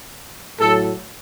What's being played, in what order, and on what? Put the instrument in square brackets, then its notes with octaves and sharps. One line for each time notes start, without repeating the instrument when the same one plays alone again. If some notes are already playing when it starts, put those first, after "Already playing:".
[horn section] A2 F#3 A4